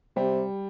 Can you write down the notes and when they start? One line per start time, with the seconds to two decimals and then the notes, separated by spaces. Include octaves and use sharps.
0.16 C3 G3